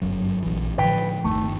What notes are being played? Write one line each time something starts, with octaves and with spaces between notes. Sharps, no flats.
G1 F#2 F#3
A#1 E3
A2 D3 F3 B4 G5
G1 D#2 D#3 A3